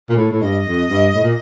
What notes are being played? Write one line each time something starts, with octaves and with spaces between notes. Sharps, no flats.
A#2
A2
A2
G2 D#5
F2
G2
A2
A#2